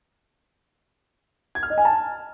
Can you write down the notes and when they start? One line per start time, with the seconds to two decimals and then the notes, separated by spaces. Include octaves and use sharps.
1.55 G#6
1.63 F6
1.70 D#5
1.78 G#5
1.85 A5